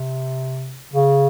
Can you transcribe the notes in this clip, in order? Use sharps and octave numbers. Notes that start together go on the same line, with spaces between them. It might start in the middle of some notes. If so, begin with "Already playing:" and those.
Already playing: C3
C#3